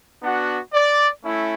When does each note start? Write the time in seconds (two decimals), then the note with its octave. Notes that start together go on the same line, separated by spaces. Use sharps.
0.23 B3 D4 F#4 F#5
0.74 D5
1.24 A3 C#4 E4